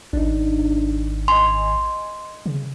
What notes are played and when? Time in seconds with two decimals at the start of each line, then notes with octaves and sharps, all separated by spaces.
0.13 G#1 D4 D#4
1.28 D#5 G#5 C6
2.46 C#3